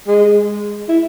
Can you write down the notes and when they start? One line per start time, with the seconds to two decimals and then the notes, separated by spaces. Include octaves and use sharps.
0.08 G#3
0.89 E4